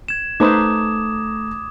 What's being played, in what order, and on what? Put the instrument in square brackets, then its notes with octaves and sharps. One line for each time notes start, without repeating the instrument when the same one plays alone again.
[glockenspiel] G#6 E7
[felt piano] A3 A#5 [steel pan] D#4 B4 C5 [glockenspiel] D6 D#6 E7